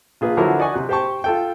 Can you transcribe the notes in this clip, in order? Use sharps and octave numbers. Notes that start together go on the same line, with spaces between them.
A#1 F4 G#4 B4
D3 F3 F#3 E4 A#4 C#5
D5 D#5 F#5 G#5 C#6
C3 F#6
G4 C5 G5 A5 C#6
F4 A4 G5